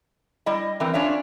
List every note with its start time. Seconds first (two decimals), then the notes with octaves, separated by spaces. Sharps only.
0.46 G3 E4 D#5
0.80 E3 C4 A#4
0.94 C#4 D4 F4 C#5 E5